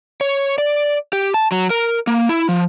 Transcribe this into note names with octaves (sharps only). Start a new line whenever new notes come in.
C#5
D5
G4
A5
F#3
A#4
A#3
E4
F3